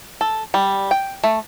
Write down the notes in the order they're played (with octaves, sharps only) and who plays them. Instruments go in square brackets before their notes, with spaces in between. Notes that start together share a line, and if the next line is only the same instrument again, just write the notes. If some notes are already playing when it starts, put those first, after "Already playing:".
[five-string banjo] A4
G3
G5
A3